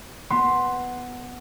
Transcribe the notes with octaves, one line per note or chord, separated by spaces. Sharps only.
B3 C6